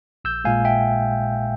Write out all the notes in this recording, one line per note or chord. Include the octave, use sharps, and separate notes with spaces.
A#1 E6 G6
A#2 G#3 F5 G#5
E5 G5